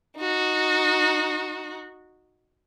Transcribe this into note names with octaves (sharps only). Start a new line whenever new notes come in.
D#4 F#4